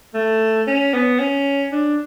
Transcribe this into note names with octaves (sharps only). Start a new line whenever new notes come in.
A3
C#4
B3
C#4
D4